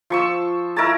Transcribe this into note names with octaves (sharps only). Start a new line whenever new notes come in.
F3 C#6 E6
E4 A#4 C#5 A5